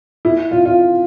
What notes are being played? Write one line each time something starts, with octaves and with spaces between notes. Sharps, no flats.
E4
F4
F4